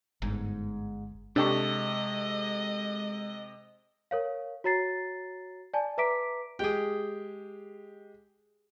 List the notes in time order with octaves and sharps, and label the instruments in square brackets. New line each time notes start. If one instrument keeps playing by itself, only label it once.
[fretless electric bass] G1 [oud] G#2
[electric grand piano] C3 A4 C#6 [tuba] G#3 [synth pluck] D4 G4 [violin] D#5
[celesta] A#4 C#5 F5
F#4 C#5 A#5 A6 C7
D5 G#5 A5
B4 E5 A#5 D6 B6 D7
[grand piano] G#3 G4 [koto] G#4 G5